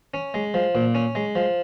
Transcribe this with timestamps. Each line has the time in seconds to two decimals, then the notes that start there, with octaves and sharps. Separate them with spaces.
0.14 C#4
0.34 G#3
0.54 F3
0.75 A#2
0.95 C#4
1.15 G#3
1.35 F3